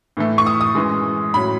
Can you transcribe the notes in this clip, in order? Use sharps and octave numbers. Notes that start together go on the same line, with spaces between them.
A2 E3 A3
C#6
D#6
D#6
F#2 E3 G#3
A2 F#3 C#4 B5